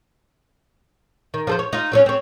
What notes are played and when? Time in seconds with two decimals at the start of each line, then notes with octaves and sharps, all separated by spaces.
1.34 D#3
1.47 F3 A4 C5
1.59 C#5
1.73 D#4 F4
1.92 F#3 C4 C#4
2.06 C4 C#5